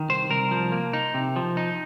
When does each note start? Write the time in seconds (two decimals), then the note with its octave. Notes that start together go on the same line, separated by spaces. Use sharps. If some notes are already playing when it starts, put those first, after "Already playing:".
Already playing: D#3
0.09 C2 C5
0.30 C2 A#4
0.51 F3
0.72 A#3
0.93 D#4
1.14 C3
1.36 F3
1.57 D#4